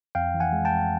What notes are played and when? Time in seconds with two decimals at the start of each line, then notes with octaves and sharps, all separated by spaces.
0.15 F2 F5 G5
0.34 E3
0.40 F#5 G#5
0.53 G#3
0.65 G5 A5
0.71 F2